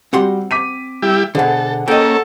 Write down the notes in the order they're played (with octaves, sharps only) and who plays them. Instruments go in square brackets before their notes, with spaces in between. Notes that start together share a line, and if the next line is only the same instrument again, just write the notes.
[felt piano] G3 F#4 G4 [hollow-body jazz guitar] C4 F#5 C6
[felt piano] D6 B6 D#7
[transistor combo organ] G3 E4 G4
[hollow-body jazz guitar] B2 D3 [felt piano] G#4 C5 F#5 [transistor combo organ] A4
[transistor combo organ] A#3 C#4 [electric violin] A4 [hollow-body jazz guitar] D#5 G5